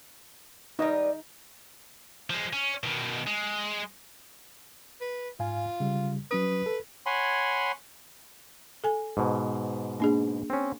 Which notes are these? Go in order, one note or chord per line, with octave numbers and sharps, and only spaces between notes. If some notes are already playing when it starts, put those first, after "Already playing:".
G3 D#4 B4 D#5
F3 G#3
C#4
B2 D#3
G#3
B4
G#2 F4 F5 G#5
C#3 G3
F#3 C#4 B4 D#6
A4
C#5 F#5 G#5 B5 C6
A4 G#5
G#2 B2
A#3 D4 G#4
C4 C#4